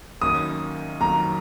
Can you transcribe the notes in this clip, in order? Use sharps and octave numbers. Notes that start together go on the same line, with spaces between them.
F#2 D#3 A#3 C#4 D#6
F2 D#3 F#3 A#3 A#5